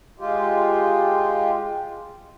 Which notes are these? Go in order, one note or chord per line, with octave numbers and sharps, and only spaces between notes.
G#3 F4 G4